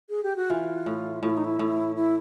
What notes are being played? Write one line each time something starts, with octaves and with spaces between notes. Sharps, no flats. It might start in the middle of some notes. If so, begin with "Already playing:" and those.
G#4
G4
F#4
E3 F4
A2
A2 F4
E4
D#4
E4
A2
E4